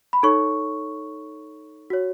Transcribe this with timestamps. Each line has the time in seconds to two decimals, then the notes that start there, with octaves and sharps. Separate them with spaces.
0.13 B5
0.23 D#4 A4 C#5 C#6
1.90 F#4 C#5